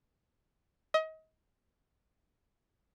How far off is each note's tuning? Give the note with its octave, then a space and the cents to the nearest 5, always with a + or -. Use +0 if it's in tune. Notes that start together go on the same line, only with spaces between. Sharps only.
D#5 +30